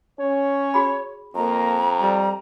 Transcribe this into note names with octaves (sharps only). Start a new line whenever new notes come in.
C#4 C#5
F#4 G#4 B5
F2 A#3 A#5
G3